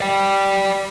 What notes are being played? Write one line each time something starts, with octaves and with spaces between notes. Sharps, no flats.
D5 G5